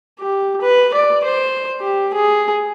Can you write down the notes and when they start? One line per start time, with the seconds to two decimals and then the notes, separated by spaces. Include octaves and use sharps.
0.19 G4
0.61 B4
0.94 D5
1.24 C5
1.81 G4
2.13 G#4